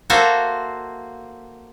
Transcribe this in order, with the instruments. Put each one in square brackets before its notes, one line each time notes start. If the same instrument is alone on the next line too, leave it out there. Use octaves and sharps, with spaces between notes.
[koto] A#3 F#4 A4 C5 E5 F5